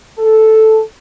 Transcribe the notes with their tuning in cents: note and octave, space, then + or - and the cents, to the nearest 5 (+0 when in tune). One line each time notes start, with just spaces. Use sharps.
A4 -5